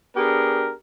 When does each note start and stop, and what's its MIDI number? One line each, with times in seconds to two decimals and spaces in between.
0.16 0.72 59
0.16 0.72 62
0.16 0.72 67
0.16 0.72 68
0.16 0.72 70